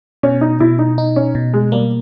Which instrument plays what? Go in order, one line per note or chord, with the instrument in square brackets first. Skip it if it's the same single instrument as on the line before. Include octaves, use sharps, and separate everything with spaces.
[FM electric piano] B2 [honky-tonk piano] C#4
[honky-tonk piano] D#4
[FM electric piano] B2 [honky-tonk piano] E4
[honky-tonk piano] D#4
[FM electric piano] D#4
[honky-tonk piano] C#4
[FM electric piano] B2
[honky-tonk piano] G#3
[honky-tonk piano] G3 [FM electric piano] A#3